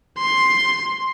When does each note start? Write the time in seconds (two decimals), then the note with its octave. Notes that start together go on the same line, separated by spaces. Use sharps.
0.19 C6